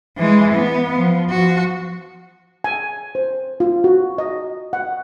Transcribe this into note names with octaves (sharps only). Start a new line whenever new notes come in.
E3 G#3
B3
F3
F3 F#4
G#5
C5
F4
F#4
D#5
F#5